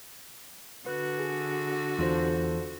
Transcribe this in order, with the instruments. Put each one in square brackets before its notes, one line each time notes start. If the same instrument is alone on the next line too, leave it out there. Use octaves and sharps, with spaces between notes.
[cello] D3 F#4 [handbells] B4 F#6
[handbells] G#4
[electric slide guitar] E2 D4 [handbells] F4 A4 C5